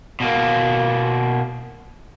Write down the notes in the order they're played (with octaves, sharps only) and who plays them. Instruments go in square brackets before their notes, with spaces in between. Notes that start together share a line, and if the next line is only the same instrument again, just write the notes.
[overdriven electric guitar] B2 A#3